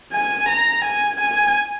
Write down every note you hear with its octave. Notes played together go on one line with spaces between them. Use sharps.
G#5
A#5
G#5
G#5